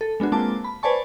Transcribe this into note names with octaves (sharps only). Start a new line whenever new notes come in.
A4
G#3 B3 D4 F#4
G#3 A#3 C4 F4 A5 D6
B5
B4 C5 D5 G#5 A5 C#6